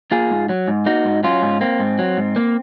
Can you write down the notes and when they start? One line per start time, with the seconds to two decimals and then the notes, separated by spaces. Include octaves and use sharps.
0.11 A#3 F4 G#4
0.31 G#2
0.49 F#3
0.68 G#2
0.86 A#3 D#4 F#4
1.05 G#2
1.23 F#3 C#4 F4
1.42 G#2
1.61 A#3 C4
1.80 G#2
1.99 F#3
2.17 G#2
2.36 A#3